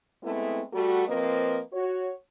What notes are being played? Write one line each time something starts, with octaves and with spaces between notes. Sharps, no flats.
G#3 A3 B3 C4 E4
G3 A3 F#4
F3 A#3 C4 B4 D#5
F#4 C#5